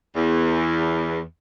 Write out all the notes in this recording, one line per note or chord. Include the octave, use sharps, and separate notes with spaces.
E2